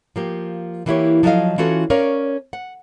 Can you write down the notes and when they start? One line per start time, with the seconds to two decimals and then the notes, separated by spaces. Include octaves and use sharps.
0.16 F3 A#3 G4
0.86 E3 A#3 B3 E4 G4 C#5
1.23 F3 F#3 A4 A#4 D#5 F5
1.58 E3 C#4 F4 F#4 A4
1.90 C#4 A#4 C#5 D5 F5
2.53 F#5